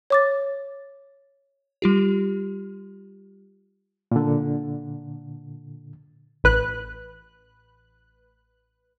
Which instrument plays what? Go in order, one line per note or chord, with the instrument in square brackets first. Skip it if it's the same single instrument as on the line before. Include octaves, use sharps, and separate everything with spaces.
[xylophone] C#5 D6 A6
[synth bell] G3 F4 G4
[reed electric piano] A#2 D3
[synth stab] A1 B4 F#6